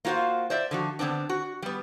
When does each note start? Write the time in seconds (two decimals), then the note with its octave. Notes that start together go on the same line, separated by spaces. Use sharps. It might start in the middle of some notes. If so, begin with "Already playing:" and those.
0.05 A#3 F4 F#4 C5 F5
0.50 C5 D5 E5
0.71 D3 F3 F#4
0.99 D3 B3 C4 D4
1.29 F#4
1.62 G3 B3